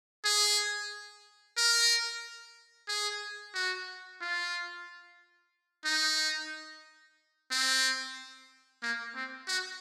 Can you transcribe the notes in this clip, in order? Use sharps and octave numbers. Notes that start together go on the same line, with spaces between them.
G#4
A#4
G#4
F#4
F4
D#4
C4
A#3
C4
F#4